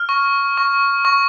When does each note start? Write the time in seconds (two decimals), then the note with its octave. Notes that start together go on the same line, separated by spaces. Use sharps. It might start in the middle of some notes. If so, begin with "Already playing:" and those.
Already playing: F6
0.09 C#6
0.57 C#6
1.05 C#6